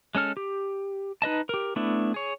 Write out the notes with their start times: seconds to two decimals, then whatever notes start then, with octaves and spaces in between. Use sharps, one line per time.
0.15 G#3 C#4 A4 F6
0.37 G4
1.22 D#4 B4 D#5 A5
1.49 G4 A#4
1.76 A3 B3 D4 E4
2.14 G#4 C#5